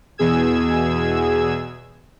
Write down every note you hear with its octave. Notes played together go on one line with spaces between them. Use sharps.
E2 B2 G#4 E6 G#6